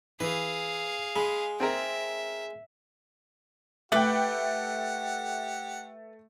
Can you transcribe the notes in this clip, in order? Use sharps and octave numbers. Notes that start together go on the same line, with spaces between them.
E3 G#4 B4 F5
G#3 B5
C4 G#4 A#4 E5
A3 G4 B4 F#5 G5 B5 D6